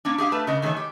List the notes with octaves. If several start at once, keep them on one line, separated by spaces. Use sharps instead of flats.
A#3 C#4 D4
G4 G#4 E5 F5
A3 B4 A5
C#3 A#4 D#5
D#3 E3 G#3 A3 C#5
G4